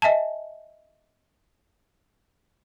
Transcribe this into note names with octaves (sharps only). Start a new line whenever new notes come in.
D#5 E5 G#5 A5